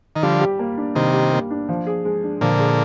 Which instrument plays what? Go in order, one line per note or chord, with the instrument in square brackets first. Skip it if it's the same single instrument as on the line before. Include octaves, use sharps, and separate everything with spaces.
[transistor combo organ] D#3
[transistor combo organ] D3 F3 [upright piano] G3
[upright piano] G4
A#3
D4
[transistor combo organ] C3 D#3 [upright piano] G3
[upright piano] G4
A#3
D4
F3
G#4
G#3
D4
[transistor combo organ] A#2 D3 [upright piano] F3
[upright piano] G#4